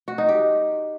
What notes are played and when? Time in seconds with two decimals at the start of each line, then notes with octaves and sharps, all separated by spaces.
0.08 F#4
0.18 D#4
0.29 G4